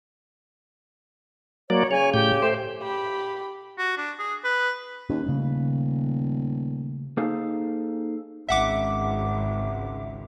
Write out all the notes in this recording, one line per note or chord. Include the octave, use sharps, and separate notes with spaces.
F#3 A#3 C#5 D5
C#3 C#5 G#5
A2 G4 G6
A3 C5
G4 B5
F#4
D4
G#4
B4
D#2 C#4
D#1 C#3 A3
A#3 D#4 G#4 A4 C5 F5
G#1 C#2 E5 F#5 D6